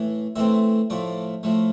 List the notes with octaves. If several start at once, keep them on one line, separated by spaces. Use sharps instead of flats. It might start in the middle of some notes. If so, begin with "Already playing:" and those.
Already playing: A2 E3
A2 E3 A3 C4 E5
A2 F3 A3 D5
A2 F3 A3